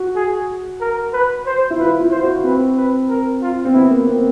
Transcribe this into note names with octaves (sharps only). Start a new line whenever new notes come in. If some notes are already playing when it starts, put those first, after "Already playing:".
Already playing: F#4
G#4
A#4
B4
C5
E4
F4 B4
F4
C5
F#4
C4 B4
B4
A#4
F4
C4
B3 E4
A#3
C4